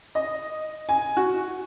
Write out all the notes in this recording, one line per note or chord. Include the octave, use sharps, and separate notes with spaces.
D#5
G#5
F#4